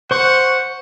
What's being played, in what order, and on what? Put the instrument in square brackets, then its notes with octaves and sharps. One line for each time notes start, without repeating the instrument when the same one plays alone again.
[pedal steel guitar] C5 C#6 [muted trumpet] F#5